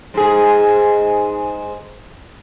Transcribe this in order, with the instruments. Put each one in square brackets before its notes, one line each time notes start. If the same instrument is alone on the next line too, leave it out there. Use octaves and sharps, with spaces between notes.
[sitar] G#2 G#4